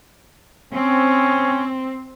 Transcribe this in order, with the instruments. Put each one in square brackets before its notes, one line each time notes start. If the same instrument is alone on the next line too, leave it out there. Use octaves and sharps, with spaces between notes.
[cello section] C4 [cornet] C#4